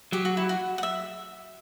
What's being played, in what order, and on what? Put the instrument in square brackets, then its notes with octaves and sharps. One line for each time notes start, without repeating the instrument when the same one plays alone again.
[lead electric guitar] F#3 [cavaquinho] G4
[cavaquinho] F#4
E4
F#4
F#5
E5